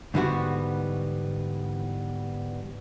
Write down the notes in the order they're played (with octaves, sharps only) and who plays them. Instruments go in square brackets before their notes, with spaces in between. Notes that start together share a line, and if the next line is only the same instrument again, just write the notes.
[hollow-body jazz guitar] G#2 D3 E3 G3 B3 F#4